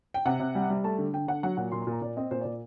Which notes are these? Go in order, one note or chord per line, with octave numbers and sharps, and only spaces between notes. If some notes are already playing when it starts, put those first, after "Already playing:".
G5
C3 F#5
C3
G3
G3
A3 A5
D3
D3 G5
D3 F#5
F#3 F#5
A#2 F#5
A#2 C6
C6
A#2 A#5
A#2 D5
C4 D#5
A#2 C5
A#2 D5